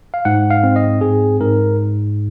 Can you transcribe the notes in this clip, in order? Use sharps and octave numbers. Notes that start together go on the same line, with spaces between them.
F5
G#2 F#5
F5
C4
D#5
G#2 G#4
G#2 A#4